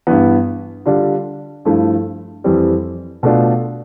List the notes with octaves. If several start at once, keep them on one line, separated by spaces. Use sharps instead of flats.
G2 E3 B3
D3 G3 D4 F4
G2 F3 A3 E4
F2 E3 G3 C4
B2 A3 D4 F4